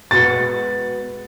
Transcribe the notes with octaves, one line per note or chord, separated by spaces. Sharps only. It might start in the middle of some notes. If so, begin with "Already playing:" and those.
G#3 B3 F#4 A6